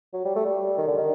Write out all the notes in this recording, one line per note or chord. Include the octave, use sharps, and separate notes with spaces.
F#3
G3
A3
G3
D#3
D3
D#3